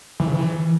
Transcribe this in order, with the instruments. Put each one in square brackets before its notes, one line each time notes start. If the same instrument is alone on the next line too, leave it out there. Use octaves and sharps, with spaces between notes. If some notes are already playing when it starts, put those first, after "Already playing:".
[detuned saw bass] E3
C#3
E3